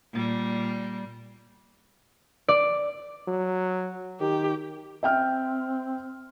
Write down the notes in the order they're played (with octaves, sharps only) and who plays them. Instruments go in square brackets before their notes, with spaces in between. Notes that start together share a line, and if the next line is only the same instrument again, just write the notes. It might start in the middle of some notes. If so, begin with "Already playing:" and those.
[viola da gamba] A#2 G3
[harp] D5
[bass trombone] F#3
[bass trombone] D#3 [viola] G4
[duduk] C4 [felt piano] E5 G5 F6